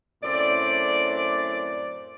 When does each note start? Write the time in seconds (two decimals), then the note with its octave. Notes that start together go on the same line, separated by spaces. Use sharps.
0.23 F#2 A2 C4 D5